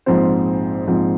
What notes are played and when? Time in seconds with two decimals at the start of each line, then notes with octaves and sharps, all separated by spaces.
0.06 A#1 G#2 F3 C4 C5
0.87 A#1 G#2 F3 C4